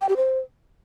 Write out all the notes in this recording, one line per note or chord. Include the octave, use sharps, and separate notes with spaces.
G5
G4
C5